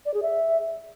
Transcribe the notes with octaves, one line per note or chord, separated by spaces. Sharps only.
D5
G#4
E5